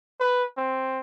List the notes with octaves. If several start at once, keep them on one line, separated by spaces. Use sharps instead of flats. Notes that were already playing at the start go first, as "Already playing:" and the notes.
B4
C4